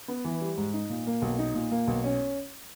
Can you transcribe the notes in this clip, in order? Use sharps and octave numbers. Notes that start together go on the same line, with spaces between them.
B3
E3
G3
G#2
D#4
A#2
A#3
B1
D#4
A#2
A#3
B1
C#4